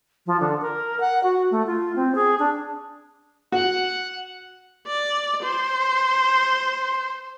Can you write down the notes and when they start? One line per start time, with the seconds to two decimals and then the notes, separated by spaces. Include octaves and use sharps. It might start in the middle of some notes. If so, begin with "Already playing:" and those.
0.26 F3
0.40 D3
0.61 A#4
1.00 F#5
1.23 F#4
1.51 A3
1.66 F4
1.96 C4
2.15 G#4
2.39 D4
3.52 F#4 F#5
4.87 D5
5.43 C5